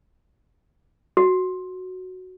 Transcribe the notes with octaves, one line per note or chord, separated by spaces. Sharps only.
F#4